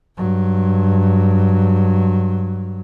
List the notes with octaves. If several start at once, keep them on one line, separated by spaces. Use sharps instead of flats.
G2 F#3